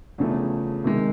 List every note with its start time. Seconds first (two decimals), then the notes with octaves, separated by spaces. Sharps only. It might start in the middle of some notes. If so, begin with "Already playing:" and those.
0.18 E2 C#3 F3 A3
0.84 C3 D#3 G#3